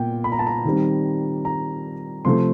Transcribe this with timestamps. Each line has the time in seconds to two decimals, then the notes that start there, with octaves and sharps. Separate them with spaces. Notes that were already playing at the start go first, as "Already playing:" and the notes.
Already playing: A#2 B3 G5
0.24 B5
0.32 A#5
0.39 A5
0.47 A#5
0.65 D#3 G3 C4
1.45 A#5
2.25 C3 F3 A3 C6